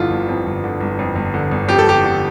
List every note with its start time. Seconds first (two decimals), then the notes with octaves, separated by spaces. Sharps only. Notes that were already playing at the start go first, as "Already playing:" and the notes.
Already playing: G1 F2 D3 E4 F4
0.11 G1
0.28 F2
0.46 G1
0.64 D3
0.81 G1
0.99 F2
1.16 G1
1.34 D3
1.51 G1
1.68 F2 G4
1.79 A4
1.87 G1 G4
2.04 D3